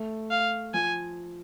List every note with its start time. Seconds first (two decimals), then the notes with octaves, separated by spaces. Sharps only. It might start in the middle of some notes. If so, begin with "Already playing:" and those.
Already playing: A3
0.31 F5
0.74 F3 G#5